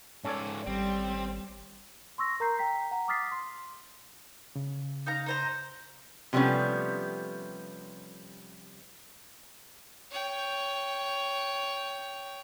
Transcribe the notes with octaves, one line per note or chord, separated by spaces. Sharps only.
G#2 C#4 A4 C#5 D5
G#1 G3 C4
C6 C#6 E6 A#6
A#4 A#5 G6 C7
G5 A#5 B6
F#5 A#5
D6 D#6 F6 A6 B6 C7
C6
C#3
D#4 F5 A#5
D#4 C5 A#5
C3 F3 G3 A3 B3 C#4
C#5 G5